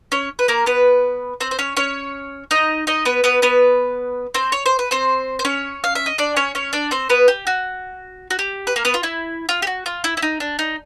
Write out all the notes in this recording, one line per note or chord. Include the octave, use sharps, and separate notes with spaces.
C#4 C#5
B4
A#3 A#4
B3 B4
C4 C5
C5
C#4 C#5
C#4 C#5
D#4 D#5
D#4 D#5
B3 B4
B3 B4
B3 B4
C4 C5
C#5
C5
B4
C4 C5
C5
C#4 C#5
F5
E5
D#5
D4 D5
C#4 C#5
C#4 C#5
D4 D5
C4 C5
B3 B4
G4
F#4
F#4
G4
B4
A#3 A#4
B3 B4
F4
E4
F4
G4
F#4
F4
E4
E4
D#4
D4
D#4